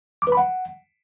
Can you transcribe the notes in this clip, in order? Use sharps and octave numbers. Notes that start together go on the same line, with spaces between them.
D6
B4
B5
F#5